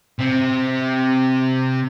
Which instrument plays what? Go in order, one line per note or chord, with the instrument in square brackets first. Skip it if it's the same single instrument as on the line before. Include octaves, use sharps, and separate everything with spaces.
[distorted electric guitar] C3 C4